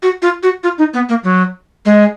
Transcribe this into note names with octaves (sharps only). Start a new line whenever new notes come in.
F#4
F4
F#4
F4
D#4
B3
A#3
F#3
G#3